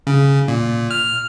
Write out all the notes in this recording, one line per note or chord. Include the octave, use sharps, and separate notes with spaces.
C#3
A#2
F6